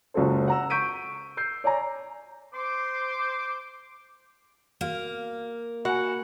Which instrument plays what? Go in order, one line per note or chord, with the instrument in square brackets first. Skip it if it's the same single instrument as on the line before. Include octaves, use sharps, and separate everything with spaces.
[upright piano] F#1 C#2 F#4 A4 C5
F#5 A#5 E6
C#6 G6 B6 D7 D#7
E6 G6 C7
C#5 D5 G#5 A#5
[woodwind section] C5 C6 D6
[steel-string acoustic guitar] A#3 [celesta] F#4 F5 F6
[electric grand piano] F#4 [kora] F#5 [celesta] G#5 B5